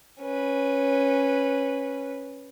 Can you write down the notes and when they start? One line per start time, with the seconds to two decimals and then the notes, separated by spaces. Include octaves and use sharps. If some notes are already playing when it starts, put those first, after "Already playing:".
0.21 C#4 B4